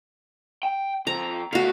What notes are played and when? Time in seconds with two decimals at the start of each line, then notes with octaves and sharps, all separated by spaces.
0.63 G5
1.07 F2 C4 A#5
1.53 B2 A3 F#4 F5